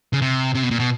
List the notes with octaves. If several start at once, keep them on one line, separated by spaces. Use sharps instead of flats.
C#3
C3
C3
B2
A#2
B2